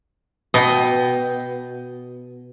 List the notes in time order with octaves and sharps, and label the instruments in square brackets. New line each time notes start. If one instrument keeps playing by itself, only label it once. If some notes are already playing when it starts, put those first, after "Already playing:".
[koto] B2 [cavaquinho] D#5 G5